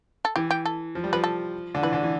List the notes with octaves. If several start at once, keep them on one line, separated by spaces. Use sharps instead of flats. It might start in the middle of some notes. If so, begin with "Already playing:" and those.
A4
E3 G4
G4
A4
F3
G3
F3 B4
A4
D3
E3 B4
D3
E3